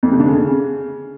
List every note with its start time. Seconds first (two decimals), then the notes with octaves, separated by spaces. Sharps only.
0.03 F2
0.11 C3
0.20 D3
0.28 C#3